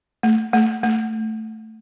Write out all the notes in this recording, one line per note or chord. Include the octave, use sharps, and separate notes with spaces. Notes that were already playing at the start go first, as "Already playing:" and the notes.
A3
A3
A3